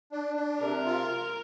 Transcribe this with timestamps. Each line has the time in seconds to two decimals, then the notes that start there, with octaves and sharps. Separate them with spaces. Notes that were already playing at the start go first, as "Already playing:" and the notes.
0.12 D4
0.36 D4
0.60 C3 A#4
0.85 F4